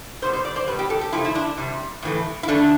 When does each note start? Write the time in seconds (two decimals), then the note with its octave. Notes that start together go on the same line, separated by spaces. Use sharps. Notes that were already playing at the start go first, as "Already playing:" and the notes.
0.22 B2 G3 C5
0.33 C5
0.45 D5
0.56 C5
0.67 G3 B4
0.72 B2
0.79 G4
0.90 A4
1.01 G4
1.12 C3 F3 A3 E4
1.25 E4
1.35 D4
1.57 C3 G3
2.03 A2 E3 A3
2.43 E4
2.48 D3 A3 D4